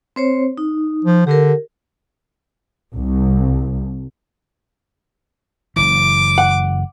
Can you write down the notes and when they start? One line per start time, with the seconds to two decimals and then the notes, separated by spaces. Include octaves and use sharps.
0.16 C4 C5 C#5
0.58 D#4
1.05 F3
1.27 D3 G4 A#4
2.96 C2
5.76 F#1 E3 D6
6.38 F#5